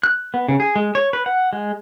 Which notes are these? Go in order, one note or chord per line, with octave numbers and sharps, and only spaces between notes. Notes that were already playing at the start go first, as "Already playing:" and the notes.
F#6
B3
C#3
G#4
G#3
C#5
B4
F#5
G#3